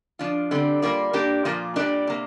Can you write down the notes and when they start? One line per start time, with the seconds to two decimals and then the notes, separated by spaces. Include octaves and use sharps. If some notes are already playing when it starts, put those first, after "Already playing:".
0.19 F3 D4 F4
0.51 D3 G3 C4
0.82 G3 A#3 F4 A#4 D5
1.13 A#3 D4 G4 A#4
1.45 A#2 F3 A#3 F4 D5
1.76 A#2 G3 D4 A#4 D5
2.07 C3 A#3